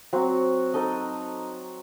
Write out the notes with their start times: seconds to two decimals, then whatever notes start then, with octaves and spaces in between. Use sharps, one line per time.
0.13 F#3 C4 F#4
0.74 D#4 A4 D#5